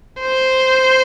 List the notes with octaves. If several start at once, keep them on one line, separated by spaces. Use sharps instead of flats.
C5